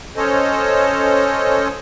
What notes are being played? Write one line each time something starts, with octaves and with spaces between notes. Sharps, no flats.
C#4 A4 C5 C#5 D#5